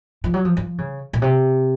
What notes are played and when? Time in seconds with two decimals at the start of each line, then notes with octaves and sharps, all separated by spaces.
0.24 F3
0.34 F#3
0.45 F3
0.57 F3
0.78 C#3
1.13 A#2
1.22 C3